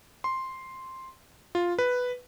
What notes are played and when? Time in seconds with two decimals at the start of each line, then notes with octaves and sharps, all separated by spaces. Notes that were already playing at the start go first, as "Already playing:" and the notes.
0.24 C6
1.55 F4
1.79 B4